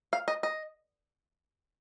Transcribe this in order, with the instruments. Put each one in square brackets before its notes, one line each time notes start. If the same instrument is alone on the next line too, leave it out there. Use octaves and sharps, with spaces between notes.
[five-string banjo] F5
D#5
D#5